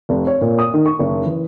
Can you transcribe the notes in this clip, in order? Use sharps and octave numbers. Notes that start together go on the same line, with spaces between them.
F1
C#5
A#2
D#6
D#3
C#6
F#1
E3